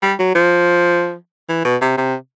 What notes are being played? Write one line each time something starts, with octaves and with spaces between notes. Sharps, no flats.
G3
F#3
F3
E3
B2
C3
C3